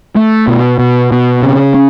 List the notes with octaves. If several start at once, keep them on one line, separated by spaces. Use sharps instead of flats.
A3
B2
B2
B2
C#3
C#4